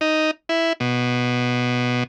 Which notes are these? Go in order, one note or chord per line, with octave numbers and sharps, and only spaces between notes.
D#4
E4
B2